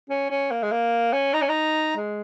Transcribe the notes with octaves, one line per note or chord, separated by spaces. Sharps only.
C#4
C#4
A#3
G#3
A#3
C#4
D#4
C#4
D#4
G#3